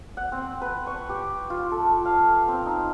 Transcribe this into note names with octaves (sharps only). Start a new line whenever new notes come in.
F#5
C4
B4
C#6
G4
F4
A4
F5
C4
D#4